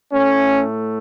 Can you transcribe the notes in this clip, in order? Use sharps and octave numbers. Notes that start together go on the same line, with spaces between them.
A2 A3 C#4